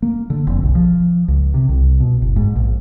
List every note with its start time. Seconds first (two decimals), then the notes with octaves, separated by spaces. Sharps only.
0.02 A#3
0.30 D3
0.47 F1
0.63 B1
0.75 F3
1.28 C#2
1.54 C3
1.69 C2
2.00 B2
2.22 F#1
2.36 G#2
2.56 A#1